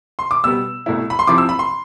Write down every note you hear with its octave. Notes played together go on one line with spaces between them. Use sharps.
C6
D6
B2 G3 B3 E6
C2 B2 A3 E4
B5
C6
C3 F3 C4 E4 D6
E6
B5
C6